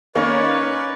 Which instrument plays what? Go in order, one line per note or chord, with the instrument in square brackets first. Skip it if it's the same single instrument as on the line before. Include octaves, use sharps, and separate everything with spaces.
[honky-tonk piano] D#3 A#3 D#4 [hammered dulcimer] C#4 A#4 [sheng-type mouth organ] B4 D5 [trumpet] C#5